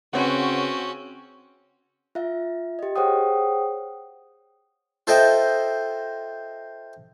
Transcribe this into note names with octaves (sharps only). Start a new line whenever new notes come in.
C#3 C4 C#4 F#4 B4 C#5 F#5
F4 E5 F5
G4 D#5
G#4 C5 C#5 F#5 G5 D#6
F4 A4 C5 D#5 E5 G5